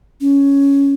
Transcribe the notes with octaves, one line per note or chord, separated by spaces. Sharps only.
C#4